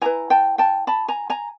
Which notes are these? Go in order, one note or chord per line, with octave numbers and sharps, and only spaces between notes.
E4 G4 B4 G#5 A#5
G5 A5
G5 A5
A5 B5
G#5 A#5
G#5 A#5